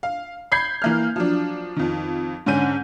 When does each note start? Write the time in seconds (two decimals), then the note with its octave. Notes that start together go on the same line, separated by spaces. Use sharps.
0.03 F5
0.52 B5 G6 G#6 C7
0.82 E3 A#3 F6
1.16 F3 F#3 D4
1.76 F2 D#3
2.46 G#2 D3 C#4 G6 D#7